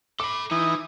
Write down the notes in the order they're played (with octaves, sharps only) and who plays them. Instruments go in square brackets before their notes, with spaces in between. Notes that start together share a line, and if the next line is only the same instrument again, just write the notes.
[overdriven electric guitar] A4 B5 [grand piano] D6
[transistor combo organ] E3 [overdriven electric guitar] D#4 [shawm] D#6